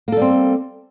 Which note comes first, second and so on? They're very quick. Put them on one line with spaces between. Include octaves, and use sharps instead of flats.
A#3 A4 G3 C4